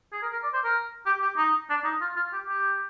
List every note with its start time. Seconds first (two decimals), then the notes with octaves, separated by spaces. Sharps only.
0.12 G#4
0.22 A#4
0.33 A#4
0.43 D5
0.53 C5
0.64 A#4
1.06 G4
1.22 G4
1.37 D#4
1.70 D4
1.85 D#4
2.01 F4
2.16 F4
2.33 G4
2.49 G4